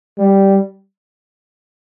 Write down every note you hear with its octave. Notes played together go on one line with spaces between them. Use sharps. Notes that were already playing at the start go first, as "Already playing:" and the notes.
G3